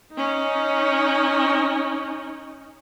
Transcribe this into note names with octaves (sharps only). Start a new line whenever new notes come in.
C#4 D#4